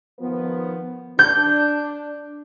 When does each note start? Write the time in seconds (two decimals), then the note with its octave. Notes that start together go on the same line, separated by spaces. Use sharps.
0.19 D#3 F3 B3
1.19 D4 G6